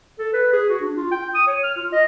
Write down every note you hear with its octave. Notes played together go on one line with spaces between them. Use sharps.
A4
B4
G#4
F#4
D4
F4
G5
D#6
C#5
F6
F4
D#5